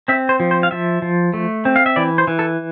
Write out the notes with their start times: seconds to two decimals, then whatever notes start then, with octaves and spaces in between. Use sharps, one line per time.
0.08 C4 E5
0.29 C5
0.40 F3
0.51 C5
0.63 F5
0.71 F3 E5
1.02 F3
1.34 A3
1.65 C4
1.76 F5
1.86 E5
1.96 E3 D5
2.18 C5
2.27 E3
2.39 A4